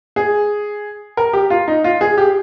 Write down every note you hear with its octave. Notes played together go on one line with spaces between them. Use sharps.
G#4
A#4
G4
F4
D#4
F4
G#4
G4